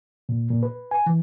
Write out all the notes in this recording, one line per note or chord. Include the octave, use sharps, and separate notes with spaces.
A#2
A#2
B4
G#5
E3